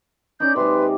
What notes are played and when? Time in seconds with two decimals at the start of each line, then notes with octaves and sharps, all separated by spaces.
0.40 C#4 D#4 D5 G6
0.56 C3 G#3 B4 C6